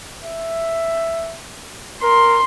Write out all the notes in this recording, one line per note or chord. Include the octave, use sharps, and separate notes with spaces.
E5
A#4 C6